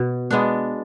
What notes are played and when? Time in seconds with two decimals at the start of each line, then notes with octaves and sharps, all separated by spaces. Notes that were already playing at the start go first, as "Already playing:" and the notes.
Already playing: B2
0.31 G#3 B3 D4